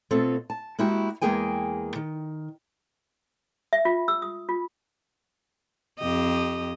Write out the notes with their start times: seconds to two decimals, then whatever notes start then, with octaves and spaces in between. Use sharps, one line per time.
0.11 B2 A3 C4 F4 A4
0.50 A5
0.79 G#3 A#3 E4 F#4 G4
1.21 E2 G#3 A#3 G#4 G5 G#5
1.96 D#3
3.73 E5
3.85 F4
4.08 E6
4.22 D#6
4.49 F4
5.99 F2 G4 D#5